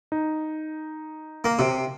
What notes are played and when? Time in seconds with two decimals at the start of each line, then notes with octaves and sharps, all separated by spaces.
0.12 D#4
1.44 A#3
1.59 C3